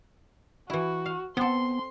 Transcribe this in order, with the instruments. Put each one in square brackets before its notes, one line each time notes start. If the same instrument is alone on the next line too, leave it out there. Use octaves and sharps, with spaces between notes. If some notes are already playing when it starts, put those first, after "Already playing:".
[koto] E3 E4 [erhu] F#4
[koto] F5
[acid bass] B3 [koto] C4 A4 [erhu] C6